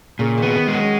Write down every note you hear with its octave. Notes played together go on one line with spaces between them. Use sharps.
A#2 C#3
D#3 B3
D#3
G#3
D#3 F#3
C#4